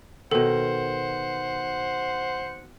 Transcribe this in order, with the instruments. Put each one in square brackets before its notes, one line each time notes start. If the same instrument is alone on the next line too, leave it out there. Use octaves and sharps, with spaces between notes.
[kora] B2 D#3 [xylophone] A4 [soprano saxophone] C5 [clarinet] F#5